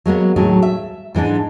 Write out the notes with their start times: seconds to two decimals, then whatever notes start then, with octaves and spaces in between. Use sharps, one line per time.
0.06 F#3 G#3 A#3 B3
0.36 D#2 A2 F#3 G#4
0.62 E5
1.15 G#2 E3 G#3 D4